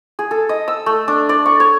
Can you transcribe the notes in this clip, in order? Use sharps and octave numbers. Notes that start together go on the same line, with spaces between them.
G#4
A4
D#5
E6
A3
D4
D5
C#6
C#5